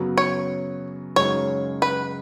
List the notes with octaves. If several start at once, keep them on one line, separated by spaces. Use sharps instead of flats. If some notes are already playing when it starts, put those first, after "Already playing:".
Already playing: F#2 C#3 F#3 B3
C#5
F#2 C#3 G#3 D#4 C#5
B4